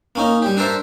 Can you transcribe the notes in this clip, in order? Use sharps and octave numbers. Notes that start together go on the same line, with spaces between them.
A#3 C#4 D#4
G3 G4
D4 A4 A#4 C5 E5